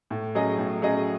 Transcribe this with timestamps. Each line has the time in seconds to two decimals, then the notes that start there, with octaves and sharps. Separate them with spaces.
0.11 A2
0.35 F#3 C#4 G#4 D#5
0.58 A2
0.82 F#3 C#4 G#4 D#5